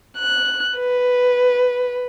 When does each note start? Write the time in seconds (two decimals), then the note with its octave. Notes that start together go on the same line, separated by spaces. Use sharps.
0.19 F#6
0.78 B4